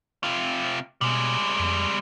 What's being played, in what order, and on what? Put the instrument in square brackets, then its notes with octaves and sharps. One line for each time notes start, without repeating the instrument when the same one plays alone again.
[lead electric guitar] C3 F4
[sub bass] B2 [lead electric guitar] G3 G#3
[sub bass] F2